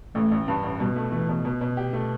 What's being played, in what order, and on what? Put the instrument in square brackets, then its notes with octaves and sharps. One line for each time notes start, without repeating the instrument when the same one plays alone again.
[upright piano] A1 [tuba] A3
[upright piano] A1
G2
A1
[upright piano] B2 [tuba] G3
[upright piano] A3
[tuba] E3 [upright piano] A3
[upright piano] B2
B2
B2
G4
A3